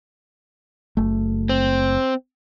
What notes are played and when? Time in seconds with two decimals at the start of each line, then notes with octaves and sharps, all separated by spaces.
0.97 F#1 A3
1.49 C4